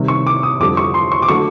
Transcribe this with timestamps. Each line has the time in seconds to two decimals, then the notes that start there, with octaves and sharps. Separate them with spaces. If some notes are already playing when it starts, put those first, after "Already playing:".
Already playing: C3 D#3 G3
0.08 C#6
0.27 D6
0.43 D#6
0.60 F2 D3 G3 D6
0.77 C#6
0.94 C6
1.12 C#6
1.22 D6
1.28 D3 F#3 A3 C#6